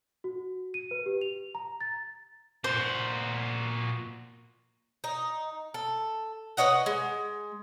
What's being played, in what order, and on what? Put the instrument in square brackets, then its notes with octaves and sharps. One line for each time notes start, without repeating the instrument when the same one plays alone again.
[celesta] F#4
D#7
B4
G4
F7
A#5
A6
[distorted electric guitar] A#2 F#4 [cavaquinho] C5
[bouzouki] D#4
A4
B4 C#5 D#5 F#5
G#3